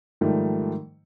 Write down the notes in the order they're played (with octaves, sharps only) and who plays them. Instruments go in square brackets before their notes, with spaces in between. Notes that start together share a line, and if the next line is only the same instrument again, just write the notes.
[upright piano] G#2 D#3 F3 G3 A3